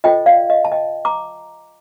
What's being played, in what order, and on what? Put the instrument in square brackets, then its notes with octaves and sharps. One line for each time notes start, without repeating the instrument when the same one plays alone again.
[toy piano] F4 A4 C5 D#5 G5
D5 F5
D#5
A5
D#5 G5
A#5 D6